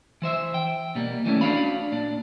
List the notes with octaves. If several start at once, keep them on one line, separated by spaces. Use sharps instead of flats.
E3 C5 E5
G5
B2 G3 A#3
D#2 D3 E3 G3 A3 C#4
D4 F#4 D5 F5 B5
A#2 D4